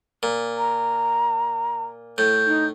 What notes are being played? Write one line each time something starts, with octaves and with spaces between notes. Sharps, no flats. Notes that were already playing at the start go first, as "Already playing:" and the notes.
A#2
A#5
A2 G6
D#4